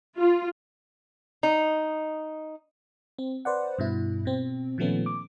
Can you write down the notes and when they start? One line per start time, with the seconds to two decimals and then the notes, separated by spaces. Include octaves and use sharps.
0.18 F4
1.43 D#4
3.19 C4
3.45 B4 C5 D5 F#5
3.79 G2 B2 E4
4.25 B2 C4
4.78 A#2 D#3 F3 A3 B3 C#4
5.06 D6